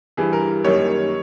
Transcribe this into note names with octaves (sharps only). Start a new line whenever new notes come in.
G2 E3 G3 G#4
A#4
F#2 D#3 G3 A#3 C#5